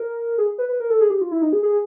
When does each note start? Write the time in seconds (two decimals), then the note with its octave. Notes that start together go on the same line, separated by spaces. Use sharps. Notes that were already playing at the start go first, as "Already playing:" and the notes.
Already playing: A#4
0.38 G#4
0.58 B4
0.69 B4
0.80 A#4
0.90 A4
1.01 G#4
1.10 G4
1.21 F4
1.31 E4
1.42 D#4
1.53 G#4
1.63 G#4